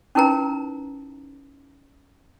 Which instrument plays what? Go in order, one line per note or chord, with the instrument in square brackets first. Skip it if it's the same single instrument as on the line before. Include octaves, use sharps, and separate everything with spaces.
[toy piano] C#4 D#4 E4 A#4 B4 A#5